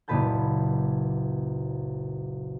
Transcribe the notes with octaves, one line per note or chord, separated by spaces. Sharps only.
F#1 C#2 A#2 B4 A5 G6